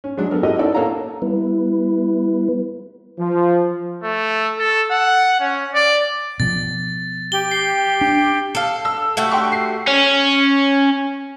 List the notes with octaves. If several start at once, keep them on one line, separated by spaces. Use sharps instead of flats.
C#4
F#3 G#3 D4
B3 A4 A#4
E4 F#4 G4 A4 A#4 D#5
C#4 D#4 E4 A4 D5
A2 A#3 A4 C#5 F5 A#5
G3 B3 E4 B4
F3
A3
A4
F#5
C#4
D5
B2 F3 A6
G4 G7
C7
D4
A4 F5
E6
A3 F#4 G4
G5 C6 C#6
C7
C#4